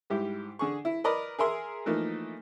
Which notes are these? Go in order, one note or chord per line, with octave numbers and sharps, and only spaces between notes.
G#2 G3 E4 G4
D3 G#4 C#6
E4
A#4 B4 D5 D#5 A#5
G#4 A#4 E5 C6
E3 F3 A3 A#3 D#4